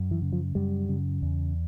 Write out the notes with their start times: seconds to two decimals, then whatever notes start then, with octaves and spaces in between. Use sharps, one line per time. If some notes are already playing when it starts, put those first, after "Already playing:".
Already playing: F#2
0.11 E3
0.22 C#3
0.33 F3
0.55 F#2 G3
0.89 C#3
1.22 E2